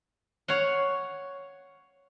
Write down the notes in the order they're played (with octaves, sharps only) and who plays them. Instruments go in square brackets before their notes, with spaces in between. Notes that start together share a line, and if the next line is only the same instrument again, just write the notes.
[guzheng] C#5 F5 F#5